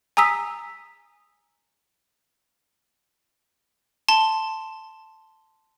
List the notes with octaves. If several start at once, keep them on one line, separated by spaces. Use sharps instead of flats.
G#5 A#5 D#6 E6 B6
A5 C6